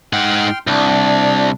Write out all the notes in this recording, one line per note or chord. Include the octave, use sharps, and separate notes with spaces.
G#2 F#5 G5 C6 F6
C2 D4